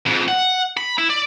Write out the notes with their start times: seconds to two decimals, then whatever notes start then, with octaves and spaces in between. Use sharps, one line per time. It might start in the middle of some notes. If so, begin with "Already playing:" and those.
0.07 F2 G#2
0.28 F#5
0.77 B5
0.98 E4
1.10 D5